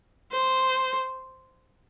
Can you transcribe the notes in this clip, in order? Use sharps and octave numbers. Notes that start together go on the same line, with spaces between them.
C5